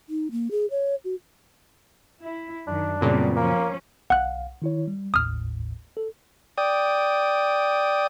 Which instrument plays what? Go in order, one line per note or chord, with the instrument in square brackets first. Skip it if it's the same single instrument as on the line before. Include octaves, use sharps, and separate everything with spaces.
[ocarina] D#4
A#3
G#4
C#5
F#4
[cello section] E4
[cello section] F#2 D#3 [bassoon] D4
[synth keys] F#2 A#2 C#3 [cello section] G3 B3 C4
[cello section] F3 C#4 [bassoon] A#3
[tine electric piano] B1 F5 [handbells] F#5 F#6
[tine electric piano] D#3 E4 C#5
G3
[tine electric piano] G#1 D#2 A2 [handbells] D#6 F6
[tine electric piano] A4
[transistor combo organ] D5 G5 D#6